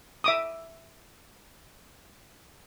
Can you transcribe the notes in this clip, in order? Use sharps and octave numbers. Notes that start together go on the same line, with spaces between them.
E5 D6 D#6